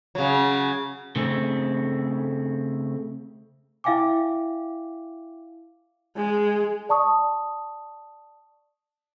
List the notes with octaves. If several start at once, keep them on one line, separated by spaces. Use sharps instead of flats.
C#3 F#3
C#3 A3 C4
E4 E5 F5 G5 G#5 D6
G#3
D5 A5 C#6 D#6